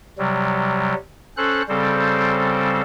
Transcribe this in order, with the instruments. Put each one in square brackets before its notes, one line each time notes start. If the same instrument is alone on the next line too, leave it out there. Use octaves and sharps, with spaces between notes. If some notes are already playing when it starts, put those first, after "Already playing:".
[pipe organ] C3 F#3 G3
C#4 A4 C5 F#6
C#3 G3 C4 A4 C5